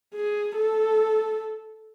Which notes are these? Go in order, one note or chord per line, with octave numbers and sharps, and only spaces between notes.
G#4
A4